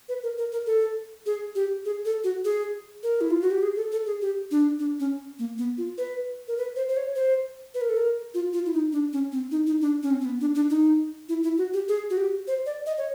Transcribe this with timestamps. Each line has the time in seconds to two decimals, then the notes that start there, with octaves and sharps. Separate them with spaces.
0.09 B4
0.23 A#4
0.38 A#4
0.52 A#4
0.66 A4
1.26 G#4
1.55 G4
1.85 G#4
2.05 A4
2.24 F#4
2.45 G#4
3.03 A#4
3.21 E4
3.30 F4
3.42 F#4
3.51 G4
3.63 G#4
3.76 A4
3.92 A4
4.06 G#4
4.22 G4
4.51 D4
4.79 D4
5.00 C#4
5.39 A#3
5.58 B3
5.78 F4
5.98 B4
6.48 A#4
6.58 B4
6.76 C5
6.89 C5
6.97 C#5
7.15 C5
7.74 B4
7.81 A#4
7.89 A4
7.97 A#4
8.34 F4
8.53 F4
8.66 E4
8.73 D#4
8.92 D4
9.13 C#4
9.32 C4
9.51 D#4
9.67 D#4
9.81 D4
10.03 C#4
10.11 C4
10.21 C4
10.25 B3
10.41 D4
10.55 D4
10.70 D#4
11.29 E4
11.43 E4
11.58 F#4
11.73 G4
11.88 G#4
12.10 F#4
12.17 G4
12.47 C5
12.66 D5
12.86 D#5
12.98 C#5